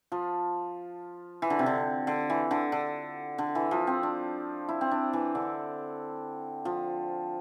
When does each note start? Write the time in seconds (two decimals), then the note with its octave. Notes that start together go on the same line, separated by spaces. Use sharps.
0.12 F3
1.42 E3
1.50 D3
1.59 C3
1.66 D3
2.07 D3
2.30 E3
2.51 D3
2.72 D3
3.38 D3
3.55 E3
3.71 F3
3.87 C4
4.03 D4
4.69 E4
4.81 C4
4.91 D4
5.13 E3
5.35 D3
6.65 F3